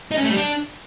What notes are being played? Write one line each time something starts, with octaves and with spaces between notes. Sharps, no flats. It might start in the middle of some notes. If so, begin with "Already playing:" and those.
D#4
C#4
A3
G3
D4